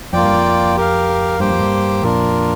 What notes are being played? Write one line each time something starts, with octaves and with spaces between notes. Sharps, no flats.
F2 A#3 F4 D5 G5
G2
F2
G4 A#4 F5
G2 A#3 G4 C5 G5
F2
G2
F2 A#2 D4 F4 A#4